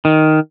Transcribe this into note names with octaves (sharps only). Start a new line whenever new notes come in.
D#3